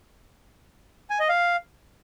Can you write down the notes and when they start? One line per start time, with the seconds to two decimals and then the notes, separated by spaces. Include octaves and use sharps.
1.10 G#5
1.20 D#5
1.29 F5